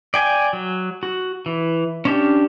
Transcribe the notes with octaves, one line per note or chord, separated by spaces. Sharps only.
D5 G5 G#5
F#3
F#4
E3
C#4 D4 G4